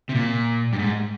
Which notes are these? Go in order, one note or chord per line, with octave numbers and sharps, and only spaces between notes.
C3
A#2
G2
G#2